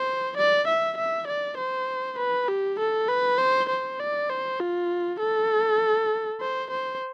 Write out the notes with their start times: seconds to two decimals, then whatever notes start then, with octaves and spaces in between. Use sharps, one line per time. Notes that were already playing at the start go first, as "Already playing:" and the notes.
Already playing: C5
0.37 D5
0.68 E5
0.97 E5
1.27 D5
1.58 C5
2.18 B4
2.48 G4
2.79 A4
3.08 B4
3.39 C5
3.69 C5
4.00 D5
4.30 C5
4.60 F4
5.20 A4
6.41 C5
6.71 C5